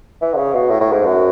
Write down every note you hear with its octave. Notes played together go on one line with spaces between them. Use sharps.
E3
D3
C#3
B2
A2
A2
G#2
F#2